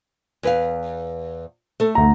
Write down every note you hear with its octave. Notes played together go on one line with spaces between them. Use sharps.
E2 B4 F5
A3 A4
D2 A#5